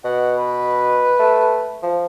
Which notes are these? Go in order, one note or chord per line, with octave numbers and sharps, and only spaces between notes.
B2 F#5
B4
A3
F3